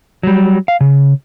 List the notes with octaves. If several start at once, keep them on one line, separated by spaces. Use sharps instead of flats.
F#3 G3
F5
C#3